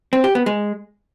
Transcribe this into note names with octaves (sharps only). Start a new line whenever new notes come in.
C4
G4
B3
G#3